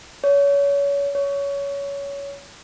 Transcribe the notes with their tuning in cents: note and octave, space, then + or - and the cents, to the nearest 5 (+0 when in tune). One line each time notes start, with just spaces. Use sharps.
C#5 +30
C#5 +20